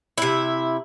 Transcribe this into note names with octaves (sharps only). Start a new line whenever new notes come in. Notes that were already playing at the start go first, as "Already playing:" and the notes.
C3 E4